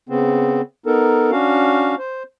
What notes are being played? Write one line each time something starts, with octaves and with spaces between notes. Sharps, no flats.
C#3 B3 C4
B3 D#4 A4 A#4
C#4 D4 F#4 F5
C5